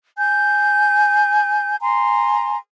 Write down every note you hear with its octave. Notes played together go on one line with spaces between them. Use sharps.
G#5 G6
G#5 A#5 C6